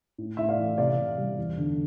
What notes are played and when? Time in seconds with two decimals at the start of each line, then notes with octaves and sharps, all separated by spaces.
0.18 A2
0.37 A2 E5
0.49 D5 F5
0.59 E3
0.78 C3 D5 F5
0.98 C3
1.18 G3
1.38 E2
1.58 D3